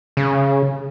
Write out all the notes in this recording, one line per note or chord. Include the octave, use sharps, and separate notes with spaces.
C#3